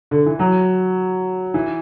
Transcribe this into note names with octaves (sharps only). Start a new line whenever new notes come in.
D3
E3
F#3
E3